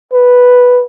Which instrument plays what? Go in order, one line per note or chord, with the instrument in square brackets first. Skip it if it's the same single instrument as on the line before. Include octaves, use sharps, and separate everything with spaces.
[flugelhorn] B4